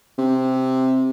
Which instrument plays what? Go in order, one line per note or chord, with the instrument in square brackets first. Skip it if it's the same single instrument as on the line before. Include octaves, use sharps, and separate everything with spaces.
[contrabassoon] C3